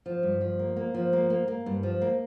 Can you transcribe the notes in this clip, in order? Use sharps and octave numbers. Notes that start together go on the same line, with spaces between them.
F3
G2
F3
A#3
A#3
F3
A#3
A#3
A#3
G2
F3
A#3